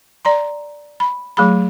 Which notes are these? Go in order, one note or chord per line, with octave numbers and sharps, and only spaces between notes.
D5 A#5 C6
B5
F#3 A3 G#4 B5